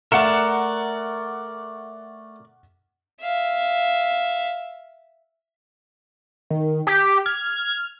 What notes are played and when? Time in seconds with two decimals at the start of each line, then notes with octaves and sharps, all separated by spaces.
0.12 A3 A#4 D5 F#5 C#7 E7
3.22 E5 F5
6.50 D#3
6.87 G4 B6
7.26 F6 G#6